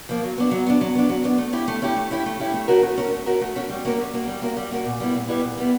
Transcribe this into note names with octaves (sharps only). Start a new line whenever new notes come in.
F3 A#3
F#3
B3 D4
F#3
B3 D4
F#3
B3 D4
F#3
B3 D4
A3
C#4 E4 G4
A3
C#4 E4 G4
A3
C#4 E4 G4
A3
C#4 E4 G4
A3
C#4 F#4 A#4
A3
C#4 F#4 A#4
A3
C#4 F#4 A#4
A3
C#4 F#4 A#4
G3
A#3 C#4 F#4 A#4
G3
A#3 C#4 F#4 A#4
G3
A#3 C#4 F#4 A#4
G3
A#3 C#4 F#4 A#4
A#2
G3 B3 E4
A#2
G3 B3 E4
A#2
G3 B3 E4